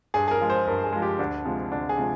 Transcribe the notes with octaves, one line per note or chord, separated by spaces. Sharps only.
G2 G#4
G#4
A#4
F3 G#3
C5
G2 A#4
G#4
F3 G#3
G4
D2 D4
C3 F3 G#3
D2 D4
G#4
C3 F3 G#3